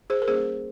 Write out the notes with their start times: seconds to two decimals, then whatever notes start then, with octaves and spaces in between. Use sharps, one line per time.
0.10 G#4 C5
0.22 A#4
0.28 G3 A#3 C#4 G#4 C5